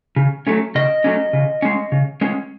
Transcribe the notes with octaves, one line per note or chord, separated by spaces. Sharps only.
C#3
F#3 A3 C#4
C#3 D#5
F#3 A3 C#4
C#3
G#3 C#4
C#3
G#3 C#4